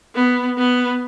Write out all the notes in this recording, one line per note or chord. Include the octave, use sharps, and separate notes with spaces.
B3
B3